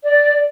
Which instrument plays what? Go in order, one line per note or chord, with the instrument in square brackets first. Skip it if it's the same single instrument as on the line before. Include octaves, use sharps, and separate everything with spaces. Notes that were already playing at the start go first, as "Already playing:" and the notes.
[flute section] D5